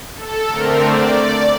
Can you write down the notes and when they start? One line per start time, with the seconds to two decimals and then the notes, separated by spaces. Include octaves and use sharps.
0.16 A4
0.48 D3 A3 C4 A#4
0.80 D5
1.12 D5